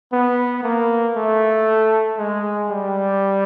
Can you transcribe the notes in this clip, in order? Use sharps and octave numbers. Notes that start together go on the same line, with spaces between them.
B3
A#3
A3
G#3
G3